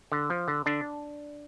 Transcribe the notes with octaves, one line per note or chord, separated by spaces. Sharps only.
D3
F3
D3
D3 D4